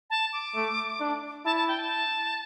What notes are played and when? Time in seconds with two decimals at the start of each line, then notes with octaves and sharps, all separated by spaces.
0.10 A5
0.33 D6
0.55 A3
1.00 D4
1.45 E4 A5
1.56 A5
1.68 G5
1.79 A5